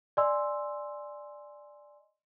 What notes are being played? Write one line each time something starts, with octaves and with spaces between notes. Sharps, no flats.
D5 D#5 G#5 C6 E6